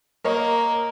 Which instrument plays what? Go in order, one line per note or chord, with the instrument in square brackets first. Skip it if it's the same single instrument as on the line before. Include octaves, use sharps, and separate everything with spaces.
[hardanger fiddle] A#3 [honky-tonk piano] A#4 C#5 D#5